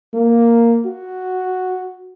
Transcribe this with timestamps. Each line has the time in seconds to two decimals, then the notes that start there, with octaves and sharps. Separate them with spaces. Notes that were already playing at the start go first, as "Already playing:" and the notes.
0.14 A#3
0.86 F#4